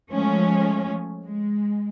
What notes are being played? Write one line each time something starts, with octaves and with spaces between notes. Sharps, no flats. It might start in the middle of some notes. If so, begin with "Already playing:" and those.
F3 G#3 A3 C#4
G#3